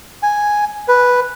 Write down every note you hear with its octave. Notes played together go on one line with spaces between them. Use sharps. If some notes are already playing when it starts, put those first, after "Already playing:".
G#5
B4